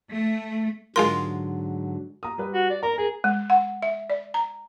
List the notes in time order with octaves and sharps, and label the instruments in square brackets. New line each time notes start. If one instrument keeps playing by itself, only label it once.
[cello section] A3
[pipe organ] G#2 D3 F#3 [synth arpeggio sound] G#3 F4 A#4 [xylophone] C6
[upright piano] A#5 D#6
G3 B4
[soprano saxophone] F#4
D5
[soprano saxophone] A#4 [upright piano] A#5
[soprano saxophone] G#4 [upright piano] A#4
[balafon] G#3
F#5
E5
D5
A#5